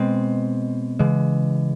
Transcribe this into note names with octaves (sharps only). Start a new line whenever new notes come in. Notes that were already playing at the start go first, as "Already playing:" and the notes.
Already playing: B2 G#3 C4
C#3 E3 G#3